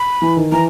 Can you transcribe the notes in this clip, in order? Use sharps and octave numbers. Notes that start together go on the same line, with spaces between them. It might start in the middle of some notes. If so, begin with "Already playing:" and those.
Already playing: B5
E3
D#3
E3 A#5